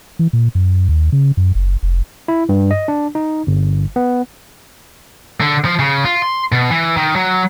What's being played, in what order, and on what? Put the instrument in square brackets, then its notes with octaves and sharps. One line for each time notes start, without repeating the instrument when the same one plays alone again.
[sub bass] E3
A#2
F#2
D#2
C#3
F#2
F#1
F1
[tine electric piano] E4
G2
D#5
D4
D#4
G1
B3
[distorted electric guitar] D3
F3
C#3
F4
C6
B2
E3
D#3
F#3